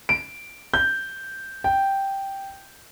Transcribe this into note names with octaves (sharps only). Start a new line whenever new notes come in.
D7
G6
G5